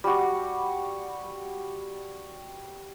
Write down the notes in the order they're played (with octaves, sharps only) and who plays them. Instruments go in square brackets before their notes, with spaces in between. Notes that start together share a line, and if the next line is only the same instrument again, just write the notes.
[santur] G3 F#4